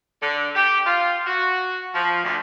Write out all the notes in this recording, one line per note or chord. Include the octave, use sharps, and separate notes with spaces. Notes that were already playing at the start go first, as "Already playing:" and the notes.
D3
G4
F4
F#4
F3
D2